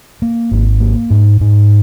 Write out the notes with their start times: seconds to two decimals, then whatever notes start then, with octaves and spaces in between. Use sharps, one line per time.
0.22 A#3
0.51 G#1
0.80 A#3
1.10 G#2
1.41 G#2